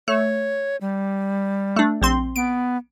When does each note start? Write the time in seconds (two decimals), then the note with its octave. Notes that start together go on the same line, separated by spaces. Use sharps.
0.08 A3 C#5
0.81 G3
1.76 A3 D4
2.01 A#1 C4 C6
2.36 B3 D7